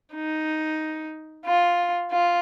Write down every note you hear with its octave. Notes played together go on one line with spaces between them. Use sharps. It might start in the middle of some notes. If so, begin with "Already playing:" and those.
D#4
F4
F4